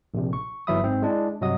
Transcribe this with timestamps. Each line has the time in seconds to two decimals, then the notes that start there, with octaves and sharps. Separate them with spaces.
0.14 A#1 C3
0.33 C#6
0.67 G1 E3 F#3 E5 B5 D#6
0.84 G#2 C4
1.02 G#3 D4 E4
1.41 G2 C3 F#3 D#5 F#5 D#6